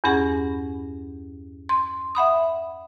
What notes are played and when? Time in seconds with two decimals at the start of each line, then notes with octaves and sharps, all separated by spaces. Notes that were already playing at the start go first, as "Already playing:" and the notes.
0.04 E2 G2 C#4 G#4 F#5
1.69 C6
2.15 E5 F#5 B5 D#6